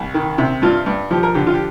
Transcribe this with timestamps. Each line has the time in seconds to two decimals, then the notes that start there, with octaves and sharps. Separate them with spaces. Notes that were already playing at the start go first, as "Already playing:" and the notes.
Already playing: C2
0.14 D#3
0.38 C3
0.62 G2 F4
0.86 G2
1.11 F3 G4
1.23 A#4
1.34 D3 G4
1.47 F4
1.54 G4